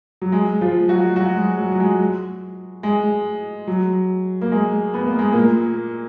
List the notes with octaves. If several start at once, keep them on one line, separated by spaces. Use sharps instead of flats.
F#3
G#3
F3 F4
F#3 F#4
F#3 F#4
G#3
F#3
F#3
G#3
G#3
F#3
A#3
G#3
B3
A#3
G#3
A#2 A#3